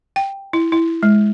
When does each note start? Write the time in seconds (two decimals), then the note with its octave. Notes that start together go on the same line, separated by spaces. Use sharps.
0.16 G5
0.53 E4
0.72 E4
1.03 G#3